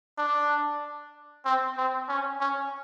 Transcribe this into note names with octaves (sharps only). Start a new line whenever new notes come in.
D4
C4
C4
C#4
C#4